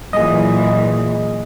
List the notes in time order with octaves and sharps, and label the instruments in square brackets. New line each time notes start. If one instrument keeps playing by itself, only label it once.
[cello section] A#2 E3 F#3 [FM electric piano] G#4 D#5